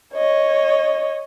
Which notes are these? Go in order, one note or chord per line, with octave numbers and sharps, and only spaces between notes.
C#5 D#5